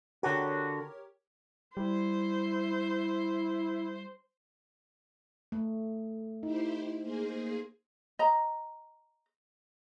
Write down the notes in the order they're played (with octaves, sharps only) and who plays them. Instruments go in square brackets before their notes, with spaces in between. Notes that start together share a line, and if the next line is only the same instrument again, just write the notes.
[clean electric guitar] D3 F#4 [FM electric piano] G4 A#4 C#5
[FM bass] G3 [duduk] E4 [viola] C5
[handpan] A3
[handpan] D#4 [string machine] E4 G4 C5
[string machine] A#3 G#4 C5
[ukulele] D#5 A#5